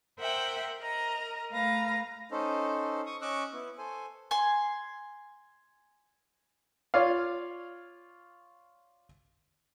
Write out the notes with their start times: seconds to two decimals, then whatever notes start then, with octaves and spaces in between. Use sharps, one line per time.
0.19 A#4 C5 E5 F#5 G5
0.79 A#4 D#5 A#5
1.52 A3 B4 F5 A#5 A#6
2.31 C#4 D#4 A4 C5
3.06 C#6 D#6
3.22 C#4 D#5 C#6 D6 E6 F#6
3.53 B3 E4
3.78 A4 C5 G#5
4.31 G#5 C6
6.94 F4 C#5 D5 F5